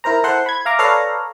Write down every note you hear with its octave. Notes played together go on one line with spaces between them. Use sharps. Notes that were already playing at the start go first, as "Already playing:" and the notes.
E4 A#4 C5 A#5
E4 A4 C5 F#5 C6
B5 G#6
E5 F5 A#5 D6
A4 B4 C#5 D5 F5 A#5